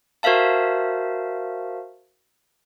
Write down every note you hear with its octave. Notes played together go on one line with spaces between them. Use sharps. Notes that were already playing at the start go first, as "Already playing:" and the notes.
F#4 A#4 C5 E5 F5 A5